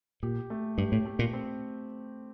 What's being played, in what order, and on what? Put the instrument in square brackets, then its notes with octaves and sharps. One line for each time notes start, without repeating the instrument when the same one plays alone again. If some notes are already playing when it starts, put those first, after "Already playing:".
[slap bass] A#2 [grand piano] G4
[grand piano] A3
[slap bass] G2 [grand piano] G4
[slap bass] A2
[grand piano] A3
[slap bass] A#2
[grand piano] C4